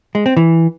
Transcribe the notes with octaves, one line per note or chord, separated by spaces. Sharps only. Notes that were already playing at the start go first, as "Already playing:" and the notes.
G#3
C4
E3